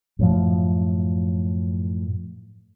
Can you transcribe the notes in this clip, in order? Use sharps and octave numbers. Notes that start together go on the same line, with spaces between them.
F#2 A2 F3